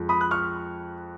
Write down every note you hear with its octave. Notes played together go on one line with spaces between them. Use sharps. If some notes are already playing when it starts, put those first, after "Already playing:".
Already playing: F2 F3 G#3
B5 D#6
F#6
C#6 F6